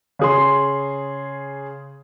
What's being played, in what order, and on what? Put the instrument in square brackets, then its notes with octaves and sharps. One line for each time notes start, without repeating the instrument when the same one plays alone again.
[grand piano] C#3 G#4 C6